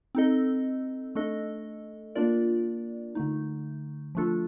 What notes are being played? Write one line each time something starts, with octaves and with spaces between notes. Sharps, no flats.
C4 D#4 A4 D#5
A3 D4 A4 D#5
A#3 D4 F4 A#4 D5
D3 A3 D#4
F3 A3 D4 F4 A4